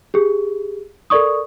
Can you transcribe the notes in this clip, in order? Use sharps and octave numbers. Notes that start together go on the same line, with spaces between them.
G4 G#4
A4 A#4 D5 C#6 D#6